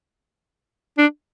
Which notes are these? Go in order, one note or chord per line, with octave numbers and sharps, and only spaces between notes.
D4